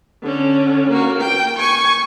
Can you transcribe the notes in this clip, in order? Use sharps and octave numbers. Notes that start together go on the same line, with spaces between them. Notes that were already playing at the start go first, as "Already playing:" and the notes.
D3 C#4
A#3 F#4
G5
G#5 C#6